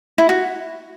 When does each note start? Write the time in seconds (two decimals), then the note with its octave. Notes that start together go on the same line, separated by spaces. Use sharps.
0.18 E4
0.29 F#4